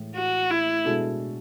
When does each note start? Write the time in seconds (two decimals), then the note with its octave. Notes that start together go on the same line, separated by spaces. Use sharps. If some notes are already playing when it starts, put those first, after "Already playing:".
Already playing: A2 E3 G#3
0.16 F#4
0.51 E4
0.86 B2 G#3 D4 F#4 A4